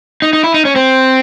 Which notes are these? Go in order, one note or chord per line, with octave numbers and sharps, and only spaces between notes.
D#4
D#4
E4
D#4
C#4
C4